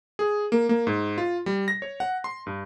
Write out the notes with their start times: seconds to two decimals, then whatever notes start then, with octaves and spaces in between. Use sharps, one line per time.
0.19 G#4
0.52 A#3
0.69 A#3
0.87 G#2
1.18 F4
1.46 G3
1.68 A#6
1.82 C#5
2.00 F#5
2.24 C6
2.47 G2